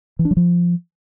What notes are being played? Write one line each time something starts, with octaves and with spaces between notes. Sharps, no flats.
E3
D4
F#3
F3